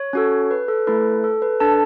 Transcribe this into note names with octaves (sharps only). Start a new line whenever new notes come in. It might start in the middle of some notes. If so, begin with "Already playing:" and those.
Already playing: C#5
C#4 F#4 A4
B4
A4
A3 E4 A4 B4
A4
B4
D4 A4 A5